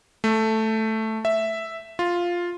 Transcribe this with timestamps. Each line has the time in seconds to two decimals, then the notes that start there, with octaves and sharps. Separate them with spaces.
0.24 A3
1.25 E5
1.99 F4